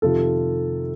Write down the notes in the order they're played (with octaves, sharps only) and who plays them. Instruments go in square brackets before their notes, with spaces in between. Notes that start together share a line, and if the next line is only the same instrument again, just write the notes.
[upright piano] F2 C3 D#3 F4 A4